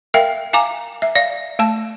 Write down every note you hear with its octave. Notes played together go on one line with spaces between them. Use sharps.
A#4 E5 F5 G5
F5 G#5 A#5 D6
E5
D5 F5
A3 A5